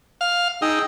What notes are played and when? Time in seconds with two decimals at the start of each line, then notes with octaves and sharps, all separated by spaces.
0.21 F5
0.62 D#4 G#4 G5 E6